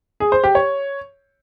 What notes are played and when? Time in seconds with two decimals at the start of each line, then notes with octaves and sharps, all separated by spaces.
0.20 G#4
0.32 C5
0.44 G4
0.55 C#5